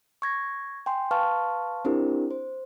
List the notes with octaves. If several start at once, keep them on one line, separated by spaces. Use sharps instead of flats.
C#6 G#6 A#6
G5 G#5 C6
B4 F5 A5 C6 C#6 F6
C4 D4 E4 G4 A#4 C5
C5